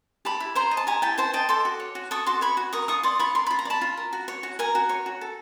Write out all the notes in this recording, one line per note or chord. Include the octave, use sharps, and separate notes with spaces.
G4 A5 B5
E4
C5 A#5 C6
D#5
A5
G4 G#5 A#5
E4 G5 A5
C5 G5 A5
D#5 G5 A5
A4 C6 D6
F#4
C#5
F#4
A4 C#6 D#6
F#4 C6 D6
C#5 B5 C#6
F#4
A#4 C#6 D#6
F4 C#6 D#6
D5 C6 D6
F4 B5 C#6
A#4 C6
F4 B5
A#5
D5
A5 B5
F4
A#4
F#4
C#5
F#4
A#4 G#5 A#5
F#4
C#5
F#4
A4